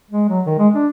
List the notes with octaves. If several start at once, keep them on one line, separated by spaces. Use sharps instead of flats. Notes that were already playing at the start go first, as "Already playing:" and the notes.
G#3
F#3
D#3
G#3
D4